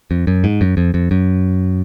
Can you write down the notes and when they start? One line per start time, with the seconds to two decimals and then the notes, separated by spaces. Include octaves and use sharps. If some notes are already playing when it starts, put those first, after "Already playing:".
0.11 F2
0.27 F#2
0.44 G#2
0.61 F#2
0.77 F2
0.94 F2
1.11 F#2